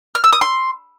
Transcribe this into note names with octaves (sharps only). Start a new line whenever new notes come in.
F6
E6
D#6
C6